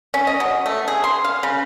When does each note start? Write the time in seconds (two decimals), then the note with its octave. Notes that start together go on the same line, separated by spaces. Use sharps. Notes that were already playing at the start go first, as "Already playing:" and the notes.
0.14 C#4
0.27 D#5
0.40 F#3
0.66 A3
0.88 G#4
1.04 C6
1.24 F5
1.43 C#3